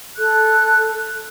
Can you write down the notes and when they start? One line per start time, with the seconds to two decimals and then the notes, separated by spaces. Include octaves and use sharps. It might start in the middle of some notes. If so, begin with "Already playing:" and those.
0.17 A4 F#6